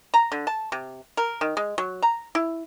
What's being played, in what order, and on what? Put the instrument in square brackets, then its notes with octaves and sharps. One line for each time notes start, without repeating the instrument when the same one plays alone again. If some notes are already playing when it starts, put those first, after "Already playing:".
[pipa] A#5
D3
A5
C3
A#4
D#3
G#3
F#3
A#5
E4